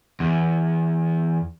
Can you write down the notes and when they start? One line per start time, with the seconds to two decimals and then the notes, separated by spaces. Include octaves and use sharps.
0.20 E2